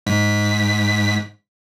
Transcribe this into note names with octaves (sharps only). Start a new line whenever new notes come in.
G#2 B6